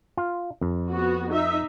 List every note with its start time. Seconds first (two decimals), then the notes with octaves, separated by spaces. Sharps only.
0.17 F4
0.61 F2
0.91 B3 F#4
1.32 D#4 E5